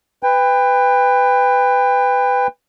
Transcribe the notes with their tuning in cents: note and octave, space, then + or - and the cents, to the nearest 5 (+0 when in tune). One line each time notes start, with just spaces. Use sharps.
B4 +15 G5 +30